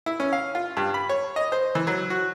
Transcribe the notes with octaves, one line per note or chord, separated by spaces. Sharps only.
E4
C#4
F5
F4
G2
B5
C#5
D#5
C5
E3
F#3
F#4